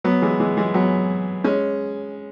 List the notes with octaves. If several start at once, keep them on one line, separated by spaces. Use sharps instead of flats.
F#3 B3
E3 G#3
E3 G#3
E3 G#3
F#3 B3
G#3 C#4